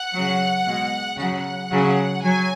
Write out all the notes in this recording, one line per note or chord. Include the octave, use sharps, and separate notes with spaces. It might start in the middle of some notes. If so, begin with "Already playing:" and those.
Already playing: F#5
C#3 F#3
B2 G#3
C#3 F#3 F#5
C#3 F#3
F#3 G#5